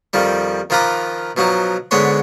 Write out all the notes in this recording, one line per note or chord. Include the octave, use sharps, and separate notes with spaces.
F2 D#3 F3 G3
D#3 F3 F4 B4 A#5 D6
B2 F3 F#3 D#4
G#2 D3 G#3 B3 C#5 C6